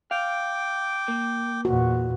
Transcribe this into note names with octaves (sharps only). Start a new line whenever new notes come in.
F5 G5 D6
A#3
E2 A#2 F#4